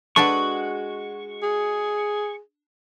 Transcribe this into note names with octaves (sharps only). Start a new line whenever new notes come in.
G#3 D4 F#4 A4 B4 C#6
G#4